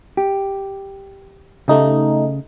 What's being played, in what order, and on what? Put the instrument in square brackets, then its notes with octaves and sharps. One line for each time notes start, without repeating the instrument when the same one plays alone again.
[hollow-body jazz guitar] G4
[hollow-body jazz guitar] C#3 [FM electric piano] A3 D#4 G4